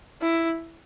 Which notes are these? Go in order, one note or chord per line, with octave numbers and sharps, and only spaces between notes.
E4